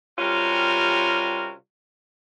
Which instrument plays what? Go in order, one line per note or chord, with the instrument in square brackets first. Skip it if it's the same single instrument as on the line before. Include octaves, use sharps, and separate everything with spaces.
[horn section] C3 G3 C#4 F4 F#4 A#4